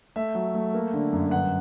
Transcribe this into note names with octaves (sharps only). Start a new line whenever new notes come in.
A3 E5
F#3
A3
A#3
D3
F#2
G1 F#5